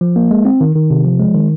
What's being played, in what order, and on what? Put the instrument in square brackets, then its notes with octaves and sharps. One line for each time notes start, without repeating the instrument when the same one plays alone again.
[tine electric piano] F3
A#3
G#3
C4
D#3
D#3
C3
F3
G#3
D#3